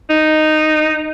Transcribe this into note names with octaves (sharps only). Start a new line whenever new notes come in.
D#4